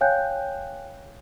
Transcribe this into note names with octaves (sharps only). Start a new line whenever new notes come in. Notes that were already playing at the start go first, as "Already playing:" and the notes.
C#5 F5 G5 G#5 F#6 G6